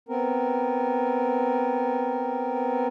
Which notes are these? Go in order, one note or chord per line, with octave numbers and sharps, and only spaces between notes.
B3 C4 A#4